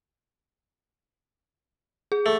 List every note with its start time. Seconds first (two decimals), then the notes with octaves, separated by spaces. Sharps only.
2.12 G#4
2.26 A3